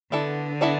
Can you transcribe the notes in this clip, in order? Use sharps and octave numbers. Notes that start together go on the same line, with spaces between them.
D3 B3 E4 A4 D5
B3 E4 A4 D5